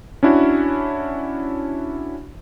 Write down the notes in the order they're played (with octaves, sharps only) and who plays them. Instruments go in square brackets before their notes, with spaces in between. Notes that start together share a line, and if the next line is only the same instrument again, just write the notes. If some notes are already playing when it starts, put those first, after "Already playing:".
[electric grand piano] C#4 D4 E4 F#4